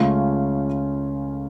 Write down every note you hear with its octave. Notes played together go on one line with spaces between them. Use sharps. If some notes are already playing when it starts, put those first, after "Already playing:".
Already playing: C#2 C#3 A3 C#4 F4